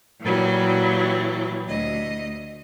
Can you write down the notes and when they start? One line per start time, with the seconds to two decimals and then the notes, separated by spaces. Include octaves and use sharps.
0.21 A#2 E3 F#3 G3
1.68 D2 D#5